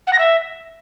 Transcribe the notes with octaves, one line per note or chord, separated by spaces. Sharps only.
F#5
A#6
E5